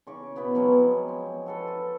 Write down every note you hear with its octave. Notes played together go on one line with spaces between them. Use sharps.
C#3 C#6 D6
B2 B3 E4 B4
F3 F#3 G#3 C4
C4
F#4 A4 B4
F4